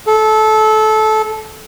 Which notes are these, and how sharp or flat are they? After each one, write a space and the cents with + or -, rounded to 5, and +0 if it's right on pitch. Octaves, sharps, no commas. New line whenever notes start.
A4 -20